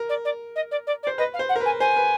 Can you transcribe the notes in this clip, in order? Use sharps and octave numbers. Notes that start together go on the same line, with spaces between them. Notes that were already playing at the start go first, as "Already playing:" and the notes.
Already playing: A#4
D5
D5
D#5
D5
D5
D5
C5
B4 D#5
F5
C5
F#5
A#4
B4
G#5
C5 G#5
B4